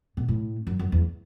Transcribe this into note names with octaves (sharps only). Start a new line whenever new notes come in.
B2
A2
F#2
F#2
E2